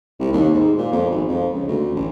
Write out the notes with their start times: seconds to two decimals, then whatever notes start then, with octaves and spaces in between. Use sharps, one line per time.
0.20 C2
0.33 D#2
0.53 G#2
0.77 A#2
0.92 F2
1.11 G#1
1.28 F2
1.53 C#2
1.68 D2
1.95 A1